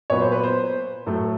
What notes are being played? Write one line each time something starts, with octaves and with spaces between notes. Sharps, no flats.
A#2 F#3 B3 C#5
C5
B4
C5
A2 F#3 A3